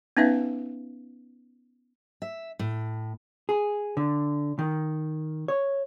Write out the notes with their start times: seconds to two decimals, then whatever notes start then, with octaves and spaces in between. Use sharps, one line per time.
0.17 B3 C#4 D#4 B4 E5 F5
2.22 E5
2.59 A2
3.49 G#4
3.97 D3
4.59 D#3
5.48 C#5